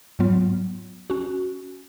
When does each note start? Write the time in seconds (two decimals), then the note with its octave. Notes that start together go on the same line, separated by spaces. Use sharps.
0.19 G#2 F#3 B3 F4
1.10 C#4 F#4